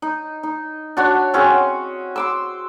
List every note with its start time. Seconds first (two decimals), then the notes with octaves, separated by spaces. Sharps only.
0.02 D#4
0.43 D#4
0.97 D4 F#4 C#5
1.34 C4 C#4 F#4 G#4
2.16 C6 D6 E6